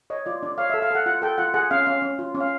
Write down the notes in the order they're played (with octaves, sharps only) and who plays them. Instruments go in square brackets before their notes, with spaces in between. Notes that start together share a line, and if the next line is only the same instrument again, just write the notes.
[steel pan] C#5 D#5
F4 D5
D4 D5
C#5 F5
E5
A4
F5
A4 F#5
F4 F#5
A4 G5
F4 F#5
G#4 F#5
C#4 F5
C#4 F5
C#4
F4
C#4
F5